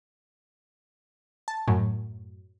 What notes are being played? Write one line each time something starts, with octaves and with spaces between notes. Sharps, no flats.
A5
F#2 A2 F#3